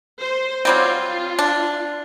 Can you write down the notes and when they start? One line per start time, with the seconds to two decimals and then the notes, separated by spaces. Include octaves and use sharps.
0.19 C5
0.65 F#3 G3 C4 F4
1.39 D4